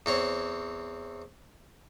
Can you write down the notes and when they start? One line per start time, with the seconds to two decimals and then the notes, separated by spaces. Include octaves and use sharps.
0.06 E2 C4 C#5